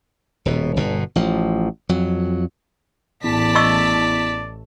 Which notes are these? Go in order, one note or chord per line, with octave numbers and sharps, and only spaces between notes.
D#1 B2
G1 B2
A1 F3
F2 F#3
A1 E2 D5 A5 B6
D#5 C#6 E6